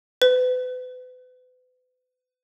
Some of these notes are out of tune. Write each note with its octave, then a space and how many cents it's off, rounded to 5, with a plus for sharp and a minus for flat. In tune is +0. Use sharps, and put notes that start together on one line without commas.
B4 +40